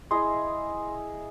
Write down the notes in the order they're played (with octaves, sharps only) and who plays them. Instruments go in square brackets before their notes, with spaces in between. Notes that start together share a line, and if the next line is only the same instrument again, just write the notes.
[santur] E4 G#4 D#5 [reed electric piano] C6